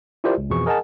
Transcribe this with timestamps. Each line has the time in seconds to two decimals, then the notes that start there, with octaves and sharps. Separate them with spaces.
0.24 E4 F4 G4 A#4 C5 D5
0.38 C#2
0.50 F2 B2 E3 F3 G#4 C#6
0.66 G#4 A#4 D#5 F#5 G#5 A5